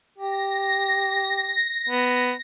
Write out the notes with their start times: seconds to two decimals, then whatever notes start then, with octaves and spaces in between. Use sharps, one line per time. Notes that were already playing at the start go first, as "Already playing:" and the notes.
0.19 G4 A#6
1.89 B3